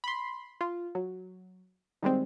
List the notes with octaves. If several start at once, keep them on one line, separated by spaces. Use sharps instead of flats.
B5 C6
F4
F#3
D#3 G3 G#3 C4